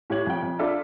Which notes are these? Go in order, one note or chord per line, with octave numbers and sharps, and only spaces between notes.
A2 G4 C#5 G#6 F#7
F2 G5
F2
D4 F4 A4 D5 E5